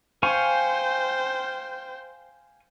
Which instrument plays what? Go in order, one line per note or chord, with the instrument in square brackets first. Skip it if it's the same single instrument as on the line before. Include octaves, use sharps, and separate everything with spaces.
[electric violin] C5 G5 [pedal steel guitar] F5 G#5 C#6